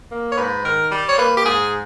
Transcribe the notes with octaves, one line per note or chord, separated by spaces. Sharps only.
A#3
C#5
G#2 B4
D#3 A#4
G3
C#5
A#3 B4
G4
G#2 G#4